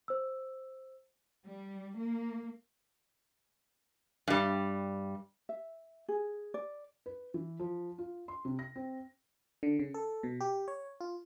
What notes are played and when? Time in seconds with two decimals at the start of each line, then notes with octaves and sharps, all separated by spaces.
0.08 C5 E6
1.46 G3
1.96 A#3
4.28 G2 G3
5.49 E5
6.08 G#4
6.54 D5
7.06 B4
7.34 E3
7.59 F3
7.98 F4
8.28 C6
8.45 C3
8.59 A#6
8.76 C4
9.63 D3
9.79 C#3
9.94 A4
10.23 B2
10.41 G4
10.68 C#5
11.01 F4